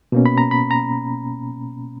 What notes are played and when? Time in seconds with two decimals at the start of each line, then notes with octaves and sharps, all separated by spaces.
0.12 B2 A#3 C#4
0.26 B5
0.38 A#5
0.51 B5
0.71 A#5